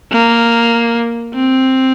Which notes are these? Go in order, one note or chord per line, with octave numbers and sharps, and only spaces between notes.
A#3
C4